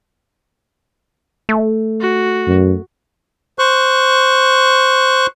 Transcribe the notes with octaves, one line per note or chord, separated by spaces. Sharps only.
A3
F#4
F#2
C5 C#6 F#6